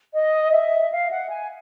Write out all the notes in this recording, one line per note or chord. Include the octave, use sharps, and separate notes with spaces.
D#5
E5
F5
F#5
G#5